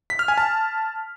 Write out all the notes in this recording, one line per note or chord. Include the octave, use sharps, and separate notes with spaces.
B6
F6
G#5
A5